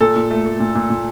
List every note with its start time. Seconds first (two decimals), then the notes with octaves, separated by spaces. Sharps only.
0.01 A#2 A4
0.16 A#2
0.30 A3
0.46 A3
0.60 A#2
0.75 A#2
0.90 A#2